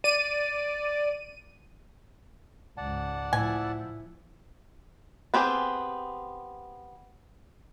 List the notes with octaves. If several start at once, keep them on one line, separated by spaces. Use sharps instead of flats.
D5 D#7
C#2 G#2 D5 F#5 A5
A2 F3 E4 G#5
B3 C4 G4 G#4